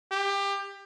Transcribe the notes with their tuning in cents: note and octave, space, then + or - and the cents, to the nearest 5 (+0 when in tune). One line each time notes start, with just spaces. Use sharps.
G4 +25